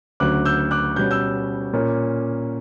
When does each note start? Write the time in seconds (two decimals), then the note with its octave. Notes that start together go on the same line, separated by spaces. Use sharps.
0.20 D2 C#3 F#3 D6 F#6
0.45 E6 G6
0.71 D6 F#6
0.96 B2 G3 C#4 G6
1.11 E6 G6
1.73 A#2 A#3 C#4